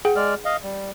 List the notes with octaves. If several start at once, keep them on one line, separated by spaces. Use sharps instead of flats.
G#4 F#5 G5
G#3 D5 F6
D#5 F5
G3